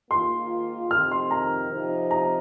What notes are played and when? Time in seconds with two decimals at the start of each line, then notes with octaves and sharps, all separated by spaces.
0.10 G#2 D#3 A#3 F4 C6
0.91 F2 C3 D#3 F6
1.12 C6
1.31 A#5
1.71 C3 F3 C4 D#4
2.11 A#5